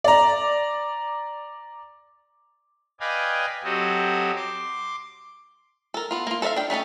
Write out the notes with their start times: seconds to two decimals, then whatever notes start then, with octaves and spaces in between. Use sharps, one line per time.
0.04 D5 A#5
3.00 B4 D5 D#5 F5 G5 G#5
3.64 F#3 C4 F#4 G4 A4 D#5
4.36 C6 D6
5.94 A4 A#4
6.11 B3 F4
6.27 A#3 F4
6.42 A4 C5 D5 E5 F5
6.56 D4 G5
6.70 A3 C#4 D#4 A4